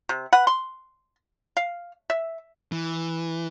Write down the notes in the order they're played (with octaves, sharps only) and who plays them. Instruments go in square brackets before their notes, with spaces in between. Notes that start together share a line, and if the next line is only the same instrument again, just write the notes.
[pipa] C3
B4 F#5
C6
F5
E5
[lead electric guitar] E3